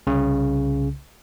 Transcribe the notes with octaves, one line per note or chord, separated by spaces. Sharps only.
C2 C#3